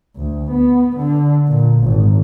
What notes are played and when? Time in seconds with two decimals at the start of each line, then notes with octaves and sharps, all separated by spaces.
0.16 D2
0.51 B3
0.97 D3
1.47 A#2
1.80 G#1